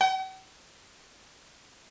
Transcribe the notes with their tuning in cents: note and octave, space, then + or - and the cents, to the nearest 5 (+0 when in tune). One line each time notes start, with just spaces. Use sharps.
F#5 +45